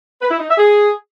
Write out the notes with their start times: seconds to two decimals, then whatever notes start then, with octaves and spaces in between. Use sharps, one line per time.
0.21 B4
0.30 E4
0.39 D#4
0.48 E5
0.57 G#4